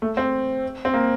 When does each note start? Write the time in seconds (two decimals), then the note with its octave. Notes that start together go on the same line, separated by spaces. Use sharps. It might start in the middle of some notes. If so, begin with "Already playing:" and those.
0.02 A3
0.17 C4
0.85 C4
0.94 A#3